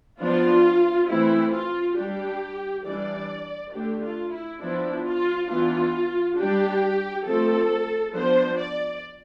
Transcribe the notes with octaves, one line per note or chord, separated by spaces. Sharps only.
F3 B3 D4 F4
E3 A3 C4 E4
F4
G3 D4 G4
E3 G3 D4 D5
D3 A3 D4 G4
F4
E4
F3 B3 D4 E4
F4
E3 B3 D4 F4
G3 D4 G4
F3 A3 C4 A4
F3 B3 D4 C5
D5